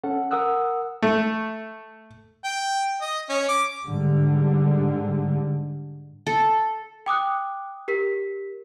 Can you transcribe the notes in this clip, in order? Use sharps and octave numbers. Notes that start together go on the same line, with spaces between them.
C#4 A4 F#5
A#4 F#5 D#6 E6 F#6
A3
G5
D#5
C#4
D6
G#2 D3 G3
A4
G5 D6 D#6 F#6
G4 A#4 B6